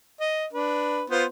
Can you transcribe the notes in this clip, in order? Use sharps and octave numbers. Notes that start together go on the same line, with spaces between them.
D#5
D4 B4
B3 F4 C5